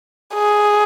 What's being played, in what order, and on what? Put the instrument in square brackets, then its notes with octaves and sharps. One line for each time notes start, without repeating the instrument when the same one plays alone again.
[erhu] G#4